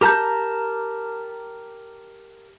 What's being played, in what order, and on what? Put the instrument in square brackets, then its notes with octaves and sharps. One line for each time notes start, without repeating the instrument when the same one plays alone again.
[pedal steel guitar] G4 A#4 A5 A#5 G6